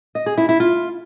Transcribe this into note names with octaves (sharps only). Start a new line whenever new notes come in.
D#5
G#4
E4
E4
F4